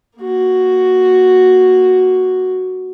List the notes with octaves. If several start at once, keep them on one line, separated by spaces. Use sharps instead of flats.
A#3 F#4